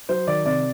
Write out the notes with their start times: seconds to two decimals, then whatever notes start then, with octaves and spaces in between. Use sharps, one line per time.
0.09 F#3 C5
0.27 D#3 D5
0.45 C3 D5